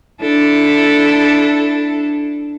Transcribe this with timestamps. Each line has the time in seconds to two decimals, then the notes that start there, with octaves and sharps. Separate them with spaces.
0.21 D4 E4 A4